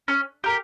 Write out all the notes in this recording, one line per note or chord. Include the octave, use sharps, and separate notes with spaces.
C#4
G4 A#4